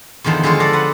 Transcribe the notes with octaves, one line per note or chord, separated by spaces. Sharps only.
E2 D3 D#3 F3 C5
D3 G#3 F4 C#5
A4 D5 F5 A#5
B4 F#5